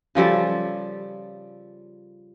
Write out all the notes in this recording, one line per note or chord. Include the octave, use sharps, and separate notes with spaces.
C#3 F3 G3 A4